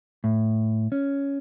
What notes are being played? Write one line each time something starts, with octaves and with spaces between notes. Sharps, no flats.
A2
C#4